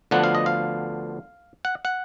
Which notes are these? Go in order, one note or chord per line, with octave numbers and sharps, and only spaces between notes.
D2 D3 F3 B3 D4 F#5
F5
D#5
F5
F#5
F#5